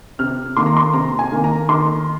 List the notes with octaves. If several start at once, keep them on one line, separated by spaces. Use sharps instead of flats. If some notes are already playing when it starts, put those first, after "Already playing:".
C3 F6
D#3 A#3 C6
A#5
C6
C3 A#5
G#5
D#3 A#3
A#5
D#3 C6